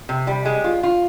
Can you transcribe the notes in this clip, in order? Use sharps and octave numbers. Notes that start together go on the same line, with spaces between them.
C3
G3
G#3
F4
F4